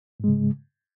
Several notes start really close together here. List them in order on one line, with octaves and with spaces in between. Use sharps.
G#2 G#3 C#3